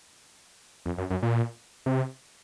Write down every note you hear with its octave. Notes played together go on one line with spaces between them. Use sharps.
F2
F#2
F#2
A#2
C3